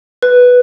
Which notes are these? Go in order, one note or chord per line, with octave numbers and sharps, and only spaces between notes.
B4